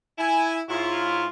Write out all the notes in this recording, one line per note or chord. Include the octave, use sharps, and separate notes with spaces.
E4 G#5
G#2 E4 F4 C#5